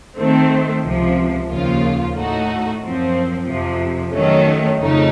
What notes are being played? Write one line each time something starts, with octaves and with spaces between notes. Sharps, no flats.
D#3 A3 C4
C#2 C3 F3
D#2 C#3 F3 A#3 F4
A2 A3 D#4 F#4
F#2 F3 C4
F2 C3 F3
D#3 F#3 A3 C#4
F2 C#3 A3 D#4